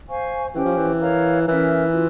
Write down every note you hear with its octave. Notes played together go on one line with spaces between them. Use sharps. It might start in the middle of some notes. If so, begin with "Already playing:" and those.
C5 F5 G#5 C#6
E3 C#4 G4 C5 G5
F3
E3
A#4 C#5 F5 A#5
E3 C#4 E4 A#4 E5
F4